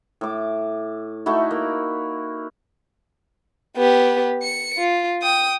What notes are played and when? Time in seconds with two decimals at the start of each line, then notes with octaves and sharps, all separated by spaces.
0.21 A2 D6
1.26 A3 D#4 E4 F#4
1.51 A#3
3.77 B3 G4
4.43 C#7
4.78 F4
5.23 G5 D#6